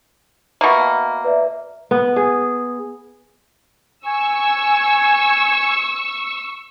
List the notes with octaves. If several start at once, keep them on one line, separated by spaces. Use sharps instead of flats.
B2 A#3 E5 B5
B4 D5 E5
B3
G#4
G#5 C#6 E6